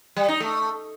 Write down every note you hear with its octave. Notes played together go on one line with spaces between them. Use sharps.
G3
D#4
A3